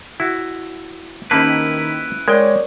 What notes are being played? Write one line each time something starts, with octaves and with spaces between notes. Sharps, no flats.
E4 F#4
D#3 A#3 C#4 E4 G4 B4 C5 A5
G#3 A#4 C#5 D5 G5